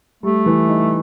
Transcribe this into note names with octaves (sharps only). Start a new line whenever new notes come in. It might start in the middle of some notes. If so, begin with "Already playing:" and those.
G3 A3
E3
D#4